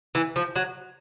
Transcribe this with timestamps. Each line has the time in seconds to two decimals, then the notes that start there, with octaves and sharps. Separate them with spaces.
0.15 E3
0.36 F3
0.56 F#3